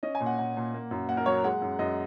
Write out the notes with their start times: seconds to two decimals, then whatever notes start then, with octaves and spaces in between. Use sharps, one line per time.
0.03 C#4 D#5
0.15 G#5
0.20 A#2
0.26 F#5
0.38 A#2 F#5
0.57 A#2
0.74 A#3
0.91 F#2
1.08 A#3 F#5
1.17 A#4
1.26 F#3 C#5
1.44 G#3 F#5
1.62 F#2
1.79 F#2 D#5